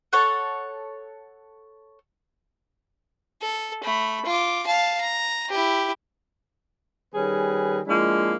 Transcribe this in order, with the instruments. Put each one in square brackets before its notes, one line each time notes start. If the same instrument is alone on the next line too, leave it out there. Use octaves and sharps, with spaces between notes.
[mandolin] A4 C#5 F#5
[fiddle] A4
A3 B5
F4 D6
F5 A5
A#5
E4 G4
[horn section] D#3 G3 C#4 G#4 B4
F3 G#3 A#3 D4 E4